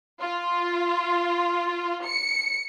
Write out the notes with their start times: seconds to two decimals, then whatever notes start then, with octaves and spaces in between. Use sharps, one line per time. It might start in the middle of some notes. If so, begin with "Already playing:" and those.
0.21 F4
2.05 C#7